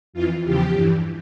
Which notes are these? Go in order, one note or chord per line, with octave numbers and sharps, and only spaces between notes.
F2 E3 F4
E2 C#3 F3 G4
G2 E3